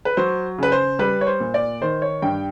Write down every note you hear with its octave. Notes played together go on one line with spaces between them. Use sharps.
B4
F#3 C5
C#3 B4
C5
G3 B4
C#5
C5
A#2
D5
D#3 C5
C#5
G2 G5